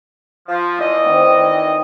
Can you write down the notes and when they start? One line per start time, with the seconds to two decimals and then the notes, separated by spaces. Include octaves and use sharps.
0.49 F3
0.79 E2 E3 F4 D#5
1.04 D#3 C4 F#5